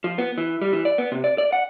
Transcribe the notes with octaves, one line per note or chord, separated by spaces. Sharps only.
F3
B3
E3
G3
E3
D5
B3
C3
D5
D5
F#5